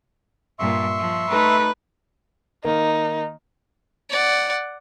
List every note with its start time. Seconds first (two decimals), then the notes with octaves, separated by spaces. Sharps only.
0.59 G2 A#2 E5 C6 C#6
0.98 F3
1.30 A3 D#4 B4
2.64 D#3 A#3 D#4
4.10 D5 F#5